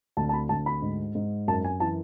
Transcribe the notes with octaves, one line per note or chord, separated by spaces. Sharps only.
D2 A5
A5
B5
D2 A5
B5
G#2
G#2
F#2 A5
G#5
E3 A5